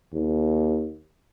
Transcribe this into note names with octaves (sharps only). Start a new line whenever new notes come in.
D#2